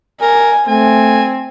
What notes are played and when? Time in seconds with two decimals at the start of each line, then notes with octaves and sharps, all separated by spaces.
0.21 A#4 G#5
0.68 A3 C4 G#5